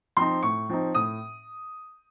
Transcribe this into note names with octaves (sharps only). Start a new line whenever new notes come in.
F3 C4 D#4 C6
A2 C#6
F3 C4 D#4
A2 D#6